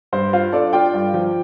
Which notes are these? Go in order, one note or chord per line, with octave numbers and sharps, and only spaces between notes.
G2 C5
F4 C5 F5
D4 A4 D5
F4 D5 G5
G2
F3